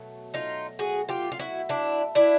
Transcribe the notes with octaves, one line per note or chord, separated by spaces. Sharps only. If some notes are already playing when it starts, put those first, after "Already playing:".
Already playing: B2 F#3 A3
D#4 F4
F#4 G#4
F4 G4
F4
E4 F#4
D4 E4
D4 E4